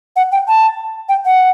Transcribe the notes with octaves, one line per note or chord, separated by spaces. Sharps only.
F#5
G5
A5
G5
F#5